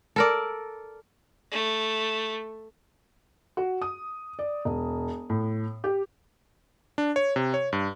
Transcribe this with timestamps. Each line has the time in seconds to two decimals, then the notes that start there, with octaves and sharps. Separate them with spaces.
0.16 A4 A#4 D5
1.52 A3
3.57 F#4
3.82 D#6
4.39 D5
4.65 E1
5.30 A2
5.84 G4
6.98 D4
7.16 C#5
7.36 C3
7.54 C#5
7.73 G2